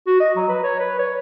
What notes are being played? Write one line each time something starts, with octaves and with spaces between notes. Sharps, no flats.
F#4
D#5
F#3
B4
C#5
B4
C#5